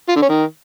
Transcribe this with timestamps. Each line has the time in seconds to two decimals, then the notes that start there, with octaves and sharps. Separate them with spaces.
0.08 F4
0.15 D3
0.22 C#4
0.29 D#3